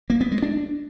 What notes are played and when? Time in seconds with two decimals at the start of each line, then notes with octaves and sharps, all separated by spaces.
0.10 A#3
0.21 B3
0.32 G#3
0.42 D4